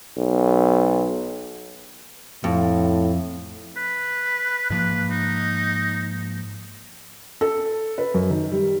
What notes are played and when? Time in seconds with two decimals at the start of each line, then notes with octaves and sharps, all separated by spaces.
0.17 B1
2.44 F2 A2
3.77 B4
4.70 G#2 F3 A#3 B4
5.11 D#4
7.41 A4
7.98 B4
8.14 F#2
8.30 D#3
8.52 G3